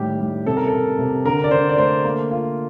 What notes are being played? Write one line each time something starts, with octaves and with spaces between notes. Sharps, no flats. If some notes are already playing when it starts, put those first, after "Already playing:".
Already playing: A2 D#3 G3 G4
G3
C3 A4
A#4
A4
C3
C3
D3 A#4
D5
D3 C5
D5
A3 C5
A#3
F4